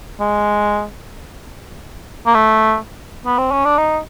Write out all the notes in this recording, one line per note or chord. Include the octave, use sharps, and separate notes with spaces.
G#3
A#3
A3
B3
C4
C#4
D4
D#4